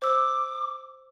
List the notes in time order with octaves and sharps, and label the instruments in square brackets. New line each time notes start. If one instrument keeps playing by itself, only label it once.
[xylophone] C5 E6 [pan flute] D6